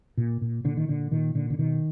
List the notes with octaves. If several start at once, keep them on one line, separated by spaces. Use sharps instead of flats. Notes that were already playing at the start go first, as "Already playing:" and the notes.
A#2
A#2
A#2 D3
D#3
A#2 D3
A#2 D#3
A#2 D3
D3
B2 D#3